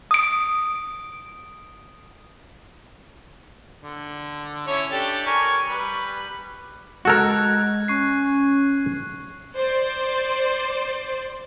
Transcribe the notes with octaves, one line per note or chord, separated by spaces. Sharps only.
D#6 D7
D3
C#4 E4 C#5
D4 G4 A4
A#4 G#5 C#6
G3 B4
G#3 F#4 A4 A#4 F#6 G#6
C#4 C#6 C7
C5 D5